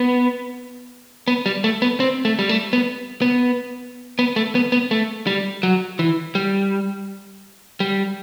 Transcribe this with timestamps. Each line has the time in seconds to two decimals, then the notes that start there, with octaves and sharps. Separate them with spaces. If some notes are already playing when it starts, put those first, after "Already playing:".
Already playing: B3
1.28 B3
1.46 G3
1.64 A3
1.82 B3
2.00 C4
2.25 A3
2.39 G3
2.49 A3
2.73 B3
3.22 B3
4.19 B3
4.36 A3
4.55 B3
4.72 B3
4.91 A3
5.27 G3
5.63 F#3
5.99 E3
6.35 G3
7.80 G3